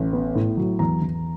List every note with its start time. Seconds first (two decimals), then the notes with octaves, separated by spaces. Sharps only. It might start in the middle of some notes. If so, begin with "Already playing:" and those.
Already playing: A1
0.13 B3
0.35 A2
0.57 F#3
0.79 E2 A#5
1.02 E2